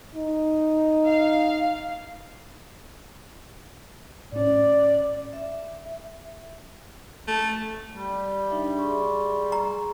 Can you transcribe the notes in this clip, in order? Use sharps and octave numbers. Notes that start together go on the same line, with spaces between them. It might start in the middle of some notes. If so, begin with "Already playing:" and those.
D#4
F5
A2 C#4 D5
E5
A3
G3
D4 D#4 E5
G#4 C6 C#6
A#5